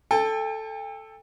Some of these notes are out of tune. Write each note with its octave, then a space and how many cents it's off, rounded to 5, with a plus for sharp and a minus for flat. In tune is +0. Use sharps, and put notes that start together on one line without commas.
A4 +0 G5 +40